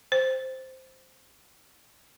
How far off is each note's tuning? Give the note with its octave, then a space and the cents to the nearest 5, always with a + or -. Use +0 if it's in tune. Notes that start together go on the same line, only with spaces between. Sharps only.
C5 -5